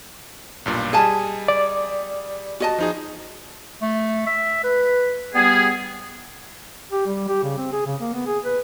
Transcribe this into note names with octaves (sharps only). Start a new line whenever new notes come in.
B1 G2 A#2
G3 G#4 D#5 G#5 A5
D5
F#4 D#5 A5
F3 D#4 G#4
A3
E5
B4
G3 B3 G#4
G4
G3
G4
C#3
C4
G#4
C#3
A#3
B3
G#4
B4